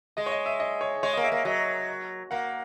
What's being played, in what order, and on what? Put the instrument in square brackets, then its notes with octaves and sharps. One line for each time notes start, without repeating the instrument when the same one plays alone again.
[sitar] G#3 [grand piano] D#5
[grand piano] C#5
D#5
E5
D#5
C#5
[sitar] G#3 [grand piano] C#5
[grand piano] D#5
[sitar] A#3
[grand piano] E5
[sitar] A#3
[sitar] F#3 [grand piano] D#5
[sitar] A#3 [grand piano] F#5